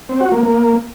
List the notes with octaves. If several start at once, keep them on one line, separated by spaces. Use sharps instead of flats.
C4
F#4
A#3
A#3